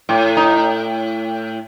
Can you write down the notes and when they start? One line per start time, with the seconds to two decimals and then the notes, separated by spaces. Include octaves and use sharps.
0.09 A2
0.37 D#4